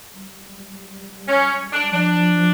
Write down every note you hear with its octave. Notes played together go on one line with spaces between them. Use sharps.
G3
C#4
D4
F3 D4